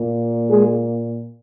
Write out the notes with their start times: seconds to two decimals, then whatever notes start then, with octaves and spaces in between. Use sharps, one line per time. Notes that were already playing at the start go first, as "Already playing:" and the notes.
Already playing: A#2 A#3
0.50 G#3 G#4